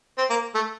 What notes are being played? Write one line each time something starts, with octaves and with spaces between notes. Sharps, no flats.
C4
A#3
A3